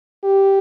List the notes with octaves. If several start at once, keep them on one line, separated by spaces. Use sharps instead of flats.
G4